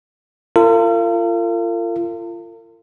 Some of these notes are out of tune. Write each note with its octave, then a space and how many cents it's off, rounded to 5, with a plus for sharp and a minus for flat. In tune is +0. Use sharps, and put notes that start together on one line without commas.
F4 -30 A#4 -45